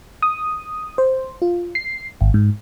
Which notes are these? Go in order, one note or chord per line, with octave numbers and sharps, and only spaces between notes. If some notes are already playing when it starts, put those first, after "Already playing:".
D#6
C5
F4
C7
G#1
G#2